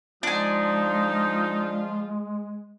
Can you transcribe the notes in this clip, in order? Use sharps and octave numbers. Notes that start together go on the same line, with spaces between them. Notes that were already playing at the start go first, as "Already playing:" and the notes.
F3 G#3 D4 D#4 F4 G#5